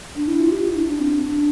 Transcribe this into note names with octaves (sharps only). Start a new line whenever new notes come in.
D4
E4
F4
G4
E4
D4
D4
C4
D4